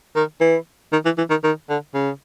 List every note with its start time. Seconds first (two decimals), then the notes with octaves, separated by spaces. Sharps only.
0.16 D#3
0.41 E3
0.93 D#3
1.05 E3
1.18 E3
1.30 D#3
1.44 D#3
1.69 D3
1.94 C#3